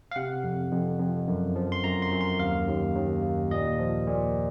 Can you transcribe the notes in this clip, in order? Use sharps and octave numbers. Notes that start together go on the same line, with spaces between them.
F5
C3 F#5
F2
F2
F2
F#2
F3
C6
F#2 A#5
C6
F#2
C6
D#2 F5
D#2
D#2
D#2
A#2 D#5
F3
A#2